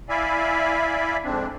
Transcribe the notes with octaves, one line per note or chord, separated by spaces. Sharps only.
E4 D5 E5 F5 G#5 B5
F2 G#2 C4 D4